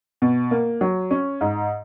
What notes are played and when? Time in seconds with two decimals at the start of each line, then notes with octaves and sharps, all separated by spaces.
0.22 B2
0.51 A#3
0.81 F#3
1.11 C#4
1.41 G#2